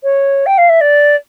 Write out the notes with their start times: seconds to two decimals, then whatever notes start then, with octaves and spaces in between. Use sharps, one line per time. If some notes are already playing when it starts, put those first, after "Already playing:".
0.03 C#5
0.46 G5
0.58 F5
0.69 E5
0.81 D5